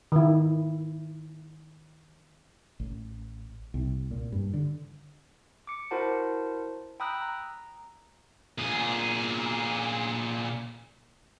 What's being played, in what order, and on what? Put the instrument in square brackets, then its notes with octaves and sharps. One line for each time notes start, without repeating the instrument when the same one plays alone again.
[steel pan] D#3 E4
[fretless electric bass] A1
C2
A#2
G2
D3
[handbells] D6 C#7
E4 F#4 A#4 C5 F#5 A5
G5 A#5 B5 D#6 E6 F#6
A#5
[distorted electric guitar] A#2 G#4